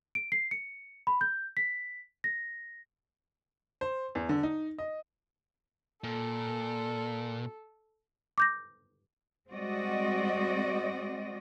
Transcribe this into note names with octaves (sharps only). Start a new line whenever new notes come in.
D7
C7
C#7
B5
G6
B6
A#6
C5
E2
D3
D#4
D#5
A#2 A4
D6 G6 A#6
G3 G#3 C4 F#4 D5 D#5